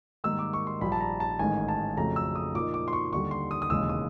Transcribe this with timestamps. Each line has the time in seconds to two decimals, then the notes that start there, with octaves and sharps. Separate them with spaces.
0.24 G#2 D#3 G3 A#3 D#4 E6
0.39 D6
0.53 C#6
0.67 C6
0.81 A#1 A#2 G3 B5
0.92 A5
1.01 A#5
1.20 A5
1.39 A1 G#2 D#3 G#3 G#5
1.68 A5
1.97 F2 C#3 F#3 A3 A#5
2.16 E6
2.35 D#6
2.54 A#2 F3 A#3 D#4 D6
2.74 D6
2.88 C6
2.93 C#6
3.12 D#2 D3 G3 C#6
3.31 C6
3.51 D#6
3.62 D#6
3.70 E1 D#2 C#3 E3 G#3 E6
3.89 D#6